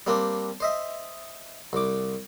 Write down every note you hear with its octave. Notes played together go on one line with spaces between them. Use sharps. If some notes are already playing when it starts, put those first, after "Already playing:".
G3 A#3 C4 D4
C5 D#5 E5
C2 D6